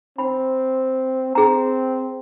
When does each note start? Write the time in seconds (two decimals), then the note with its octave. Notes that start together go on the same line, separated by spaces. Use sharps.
0.18 C4 B5
1.35 C4 G#4 A#5